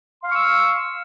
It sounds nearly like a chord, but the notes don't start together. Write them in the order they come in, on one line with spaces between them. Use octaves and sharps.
C6 F5 F6 C#6 E6